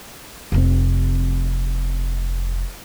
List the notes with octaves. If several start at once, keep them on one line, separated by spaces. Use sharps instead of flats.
F1 C4